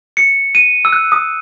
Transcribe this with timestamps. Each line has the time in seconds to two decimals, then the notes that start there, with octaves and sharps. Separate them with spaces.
0.17 C#7
0.55 D#7
0.85 E6
0.93 F#6
1.12 D#6